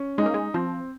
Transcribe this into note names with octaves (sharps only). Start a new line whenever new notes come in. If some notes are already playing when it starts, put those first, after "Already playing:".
Already playing: C#4
G#3 D#4
A#3
G#3
F3 C4